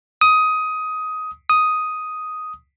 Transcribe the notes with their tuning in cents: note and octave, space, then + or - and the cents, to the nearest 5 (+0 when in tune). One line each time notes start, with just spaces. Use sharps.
D#6 +15
D#6 +5